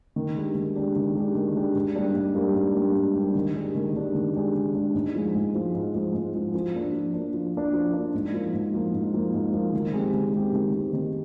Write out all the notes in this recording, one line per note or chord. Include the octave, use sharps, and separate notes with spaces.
D#3
G#3 D4 G4
D#3
G#3 D4 G4
D#3
G#3 D4 G4
D#3
G#3 D4 G4
G#2
G3 A#3 D4 G4
G#2
G3 A#3 D4 G4
G#2
G3 A#3 D4 G4
G#2
G3 A#3 D4 G4
D#3
G#3 D4 G4
D#3
G#3 D4 G4
D#3
G#3 D4 G4
D#3
G#3 D4 G4
G#2
F3 G#3
G#2
F3 G#3
G#2
F3 G#3
G#2
F3 G#3
F3
A#3 D4
F3
A#3 D4
F3
A#3 D4
F3
A#3 D4
G#2
F3 A#3
G#2
F3 A#3
G#2
F3 A#3
G#2
F3 A#3
D#3
G#3 C4 G4
D#3
G#3 C4 G4
D#3
G#3 C4 G4
D#3